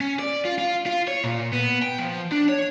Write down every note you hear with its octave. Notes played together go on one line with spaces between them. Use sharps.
C#4
D5
F4
F4
F4
C#5
A#2
B3
G5
F3
D4
C#5